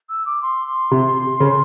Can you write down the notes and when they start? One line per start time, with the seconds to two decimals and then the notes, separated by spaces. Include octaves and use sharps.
0.09 E6
0.26 D6
0.42 C6
0.91 C3
1.40 C#3